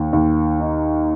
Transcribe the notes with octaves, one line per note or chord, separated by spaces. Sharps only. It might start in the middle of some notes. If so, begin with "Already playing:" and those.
Already playing: D#2
D#2
D#4